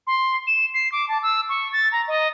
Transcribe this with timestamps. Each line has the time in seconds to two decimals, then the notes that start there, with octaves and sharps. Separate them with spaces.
0.07 C6
0.47 E7
0.74 C7
0.92 D6
1.09 A5
1.23 E6
1.49 C#6
1.73 A6
1.92 A#5
2.08 D#5